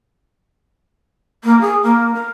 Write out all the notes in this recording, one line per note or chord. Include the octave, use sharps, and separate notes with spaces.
A#3
G#4
A#3
A#4